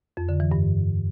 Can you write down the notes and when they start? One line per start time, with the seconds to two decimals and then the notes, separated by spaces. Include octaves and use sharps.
0.17 F2
0.29 D3
0.40 E3
0.52 G2